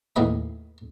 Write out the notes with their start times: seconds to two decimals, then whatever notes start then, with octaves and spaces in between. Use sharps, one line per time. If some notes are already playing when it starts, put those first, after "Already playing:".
0.16 D#2 A2 E3 G#4 D#5 B5